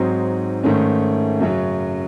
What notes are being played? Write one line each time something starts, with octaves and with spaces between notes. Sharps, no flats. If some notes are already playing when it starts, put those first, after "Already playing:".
Already playing: G#2 F#3 C4 D#4
G#2 D#3 A3 C#4
F#2 C#3 F#3